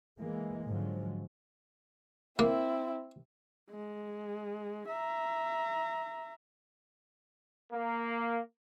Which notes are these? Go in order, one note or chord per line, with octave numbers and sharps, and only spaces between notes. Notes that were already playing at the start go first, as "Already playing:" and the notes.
E3 G#3 A#3
G#2 D3 F3 F#3 G#3
A#3 C4 E4
G#3
E5 A#5
A#3